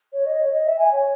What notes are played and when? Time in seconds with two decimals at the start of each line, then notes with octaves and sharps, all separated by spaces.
0.13 C#5
0.26 D#5
0.39 C#5
0.52 D#5
0.65 E5
0.78 G#5
0.92 C#5